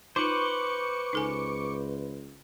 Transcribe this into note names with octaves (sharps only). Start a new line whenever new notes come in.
D#4 F4 B4 C5 C#6 D6 C#7
C#2 D#4 A4 G#5